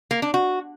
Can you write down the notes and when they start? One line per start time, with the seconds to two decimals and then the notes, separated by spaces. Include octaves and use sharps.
0.11 A#3
0.22 D4
0.34 F#4